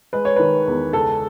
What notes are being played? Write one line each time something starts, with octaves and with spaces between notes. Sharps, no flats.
G#3 B4
C#5
D#3 B4
E2
C#2 A4